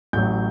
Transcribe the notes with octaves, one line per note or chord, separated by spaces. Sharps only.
A1 A2 F#3 G6